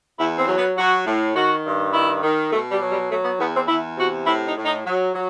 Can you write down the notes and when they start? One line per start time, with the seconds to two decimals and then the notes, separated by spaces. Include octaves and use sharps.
0.18 E2 E4
0.38 C4
0.47 F#3
0.57 B3
0.77 F#3 F#4
1.06 A2
1.35 D#3 F#4
1.64 G2
1.93 D#3 E4
2.23 D#3
2.52 B2 A3
2.71 G3
2.80 F#3
2.90 G3
3.10 F#3 A3
3.24 B3
3.38 E2 B3
3.54 C4
3.68 E2 E4
3.97 C3 F#4
4.26 A2 E4
4.46 D#4
4.56 A2
4.65 D#4
4.85 F#3
5.14 F#3